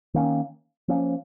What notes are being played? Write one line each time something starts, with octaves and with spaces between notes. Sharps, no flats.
D#3 A#3 C#4
F3 A#3 C#4